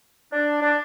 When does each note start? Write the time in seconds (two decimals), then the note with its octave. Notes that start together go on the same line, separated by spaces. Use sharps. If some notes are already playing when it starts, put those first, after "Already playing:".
0.32 D4
0.62 D4